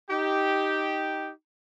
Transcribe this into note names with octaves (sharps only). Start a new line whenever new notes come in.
D#4 G4